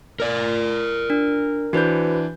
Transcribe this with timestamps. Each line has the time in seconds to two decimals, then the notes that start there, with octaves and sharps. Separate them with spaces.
0.20 A#4 D5
1.10 D4
1.73 E3 D4 F#4 B4 C5 G6